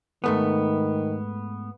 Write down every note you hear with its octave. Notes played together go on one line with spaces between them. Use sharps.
G#2 D#3 A3 B3